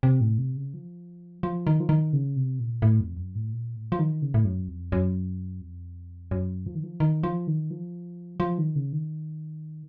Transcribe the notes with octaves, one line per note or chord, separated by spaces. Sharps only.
C3
A2
C3
C#3
F3
F3
D#3
F3
D#3
C#3
C3
A#2
A2
F2
F#2
A2
A#2
A2
F3
D#3
C#3
A2
F#2
F2
F#2
F2
F#2
F3
D#3
F3
D#3
F3
D#3
F3
F3
D#3
C#3
D#3